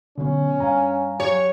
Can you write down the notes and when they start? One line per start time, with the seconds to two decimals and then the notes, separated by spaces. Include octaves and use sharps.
0.18 B1 B2 D3 C#4
0.60 G2 F5 G#5 A#5
1.20 F#3 G4 C#5